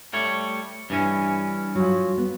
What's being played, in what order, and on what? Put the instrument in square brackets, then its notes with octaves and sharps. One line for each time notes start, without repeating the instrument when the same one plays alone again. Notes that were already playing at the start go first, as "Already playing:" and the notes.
[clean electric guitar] G3 A3 C#5
G2 E3 C#4
[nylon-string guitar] F3 F#3
B3